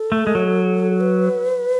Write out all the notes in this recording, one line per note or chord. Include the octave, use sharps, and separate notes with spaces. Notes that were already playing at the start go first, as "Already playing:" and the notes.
Already playing: A4
A3
G#3
F#3
B4